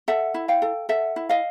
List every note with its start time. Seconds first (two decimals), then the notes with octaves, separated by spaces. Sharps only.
0.08 A4 E5 F#5
0.34 E4
0.48 F5 G5
0.62 A4
0.89 A4 E5 F#5
1.16 E4
1.29 D#5 F5